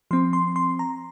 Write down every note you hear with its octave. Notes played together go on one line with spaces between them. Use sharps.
F3 C4 C6
C6
C6
A#5